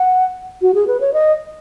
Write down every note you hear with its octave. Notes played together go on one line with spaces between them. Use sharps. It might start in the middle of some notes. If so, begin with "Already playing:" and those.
Already playing: F#5
F#4
G#4
B4
C#5
D#5